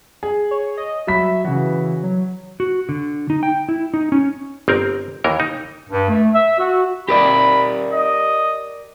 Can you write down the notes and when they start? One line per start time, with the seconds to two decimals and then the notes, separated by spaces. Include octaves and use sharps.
0.23 G#4
0.51 C#5
0.77 D#5
1.07 F#3 E5 B5 B6
1.45 C#3 E3 F#4
2.03 F#3
2.60 F#4
2.89 D3
3.30 D#4
3.43 G5
3.69 E4
3.94 D#4
4.12 C#4
4.68 G1 C4 A#4
5.24 D#2 E3 A#4
5.40 D#4
5.89 G2
6.09 A3
6.34 E5
6.57 F#4
7.09 G4 A#4 D5 B5
7.93 D#5